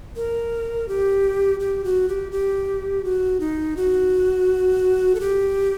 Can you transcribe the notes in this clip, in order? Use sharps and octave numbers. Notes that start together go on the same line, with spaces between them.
A#4
G4
G4
F#4
G4
G4
F#4
D#4
F#4
A4
G4